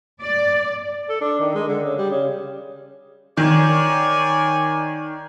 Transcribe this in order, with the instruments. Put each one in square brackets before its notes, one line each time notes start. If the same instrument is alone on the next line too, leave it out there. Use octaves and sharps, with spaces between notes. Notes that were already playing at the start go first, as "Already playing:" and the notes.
[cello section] D5
[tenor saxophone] A4
D4
D#3
G#3
D3
C#3
G3
C#3
[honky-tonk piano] D#3 [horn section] C#5 D5 G#5